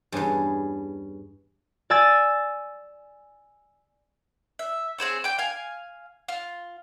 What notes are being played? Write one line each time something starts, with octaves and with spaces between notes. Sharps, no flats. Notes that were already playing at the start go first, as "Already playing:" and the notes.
E2 G2 C#4 G#4 A5
D5 G#5 E6 G#6 A6
E5
C4 G#4 C5 C#5
G5 D6
F5 G#5
F4